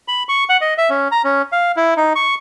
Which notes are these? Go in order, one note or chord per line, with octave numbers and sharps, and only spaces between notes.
B5
C#6
F#5
D#5
E5
C#4
A#5
C#4
F5
E4
D#4
C#6